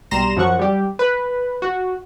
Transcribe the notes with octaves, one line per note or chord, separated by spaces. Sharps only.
B1 G3 A#5 C6 A#6 E7
F#2 F3 F#4 F#5 C#6
G3 G4
B4
F#4